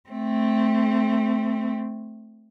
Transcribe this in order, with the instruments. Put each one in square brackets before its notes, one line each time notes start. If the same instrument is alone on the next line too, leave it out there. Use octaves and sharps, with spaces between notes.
[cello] A3 C4